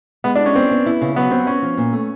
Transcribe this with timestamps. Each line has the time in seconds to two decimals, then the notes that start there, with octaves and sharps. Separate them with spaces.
0.24 G#3 B3
0.35 D4
0.40 E4
0.46 C#4
0.55 B3 C4
0.71 B3
0.86 E4
1.01 C#3
1.16 F#3 B3
1.31 B3 C4
1.47 C4 C#4
1.62 F3
1.77 A#2
1.93 A3